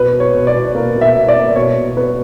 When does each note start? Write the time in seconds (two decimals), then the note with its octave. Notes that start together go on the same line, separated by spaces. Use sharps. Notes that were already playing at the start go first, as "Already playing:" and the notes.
Already playing: B2 B4
0.13 B2
0.20 C#5
0.33 B2
0.47 D5
0.54 B2
0.75 A#3
0.95 B2
1.01 E5
1.15 B2
1.28 D5
1.36 A#3
1.56 B2 C#5
1.76 B2
1.97 B2 B4